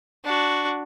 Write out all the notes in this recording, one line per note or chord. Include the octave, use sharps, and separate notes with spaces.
D4 F#4